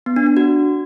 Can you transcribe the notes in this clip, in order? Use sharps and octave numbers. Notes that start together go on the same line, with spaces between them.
B3
D4
D4
F#4